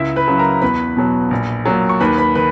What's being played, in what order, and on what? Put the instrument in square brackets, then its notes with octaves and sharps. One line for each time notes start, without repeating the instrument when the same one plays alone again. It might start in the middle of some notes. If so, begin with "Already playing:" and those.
Already playing: [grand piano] C#2 E4 E5
B4 B5
C#3 F#3
A#4 A#5
E2 B4 B5
B2 F#3
A#1
A#2 F#3
C#6
D#2 B4 B5
B4 B5
D#3 B4 B5